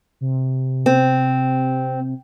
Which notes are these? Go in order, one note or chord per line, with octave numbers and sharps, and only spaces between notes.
C3
C4